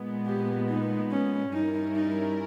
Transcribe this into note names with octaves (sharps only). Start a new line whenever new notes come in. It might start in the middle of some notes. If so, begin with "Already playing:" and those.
Already playing: A#2 G#3 B3
G4
D#4
C#4
G2 G3 C#4 D#4 E4 A#4
D#4